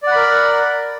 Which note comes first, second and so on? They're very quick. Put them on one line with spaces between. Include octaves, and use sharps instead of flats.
D5 F#5 B5 A#4